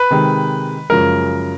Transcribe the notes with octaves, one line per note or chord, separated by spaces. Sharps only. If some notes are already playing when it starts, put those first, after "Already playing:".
Already playing: B4
C3 D#3 G#3
F#2 C#3 F3 G#3 A#4